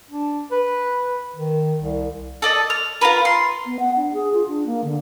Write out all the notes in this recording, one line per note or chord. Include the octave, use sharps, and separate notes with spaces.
D4
B4
D#3
C2
A4 D5 D#5
F6
F4 G#4 A#4 B4
C6
B3
F#5
D4
G#4
F4
D4
A#3
D3